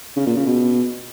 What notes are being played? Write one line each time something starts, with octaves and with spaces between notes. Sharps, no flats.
C#3
A#2
C#3
B2